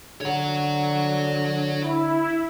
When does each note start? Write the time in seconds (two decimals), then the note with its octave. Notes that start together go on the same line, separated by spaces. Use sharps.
0.21 D3 C#5 F#5
1.81 E4